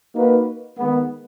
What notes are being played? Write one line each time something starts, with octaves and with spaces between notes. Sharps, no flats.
A#3 D#4 F#4 B4
D#3 G#3 B3